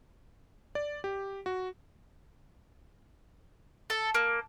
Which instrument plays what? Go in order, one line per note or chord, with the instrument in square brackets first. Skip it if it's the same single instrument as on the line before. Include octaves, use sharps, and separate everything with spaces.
[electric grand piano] D5
G4
F#4
[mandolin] A4
A#3